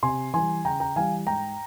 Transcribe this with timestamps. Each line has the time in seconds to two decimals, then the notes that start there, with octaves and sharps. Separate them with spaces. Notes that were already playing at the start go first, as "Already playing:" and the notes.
0.03 C3 G#5 C6
0.34 E3 G3 G#5 C6
0.65 C#3 G5 A#5
0.80 G5 A#5
0.96 E3 G3 F5 G#5
1.27 G#2 G5 A#5